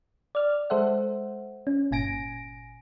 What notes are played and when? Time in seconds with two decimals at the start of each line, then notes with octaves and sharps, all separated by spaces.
0.35 D5 F6
0.70 G#3 A4 C5 E5 F#5
1.67 C#4
1.91 G1 A#2 G#5 A#6 D7